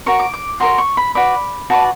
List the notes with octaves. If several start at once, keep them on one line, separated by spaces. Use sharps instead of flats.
F#4 A#4 C#5 C#6
D6
D6
F#4 A#4 C#5 C6
C#6
B5
F#4 B4 D5 B5
F#4 B4 D5 A5